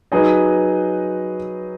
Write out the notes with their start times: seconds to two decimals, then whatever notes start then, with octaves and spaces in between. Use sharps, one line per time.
0.12 F#3 D#4 G#4 B4 D#5